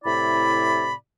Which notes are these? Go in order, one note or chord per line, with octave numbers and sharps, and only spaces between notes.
A2 C3 E4 D5 B5